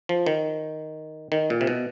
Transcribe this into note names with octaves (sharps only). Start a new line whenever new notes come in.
F3
D#3
D#3
A#2
C3
B2